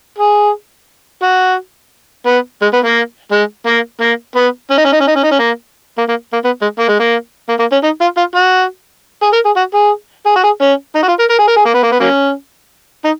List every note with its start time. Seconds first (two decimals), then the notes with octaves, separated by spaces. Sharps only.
0.19 G#4
1.23 F#4
2.27 B3
2.62 G#3
2.74 B3
2.85 A#3
3.32 G#3
3.67 A#3
4.01 A#3
4.36 B3
4.71 C#4
4.78 D#4
4.85 C#4
4.93 D#4
5.01 C#4
5.08 D#4
5.16 C#4
5.24 D#4
5.32 C#4
5.39 A#3
5.98 A#3
6.09 A#3
6.33 A#3
6.45 B3
6.62 G#3
6.79 A#3
6.89 G#3
7.00 A#3
7.49 A#3
7.59 A#3
7.72 C#4
7.83 D#4
8.01 F4
8.17 F4
8.36 F#4
9.23 G#4
9.33 A#4
9.46 G#4
9.57 F#4
9.74 G#4
10.26 G#4
10.36 F#4
10.44 G#4
10.62 C#4
10.95 D#4
11.03 F#4
11.08 F4
11.20 A#4
11.30 A#4
11.39 G#4
11.48 A#4
11.56 G#4
11.66 A#3
11.75 B3
11.83 A#3
11.92 B3
12.00 F#3 A#3 C#4
13.04 D#4